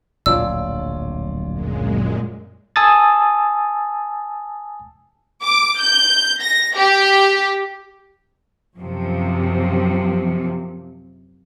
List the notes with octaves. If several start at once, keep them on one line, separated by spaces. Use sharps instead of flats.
D1 A#1 F#3 F4 C#5 D5 E6
F#2 A#2 G#3
G#5 A5 D#6 E6 A6
D6
G6
A#6
G4
F#2 C3 F3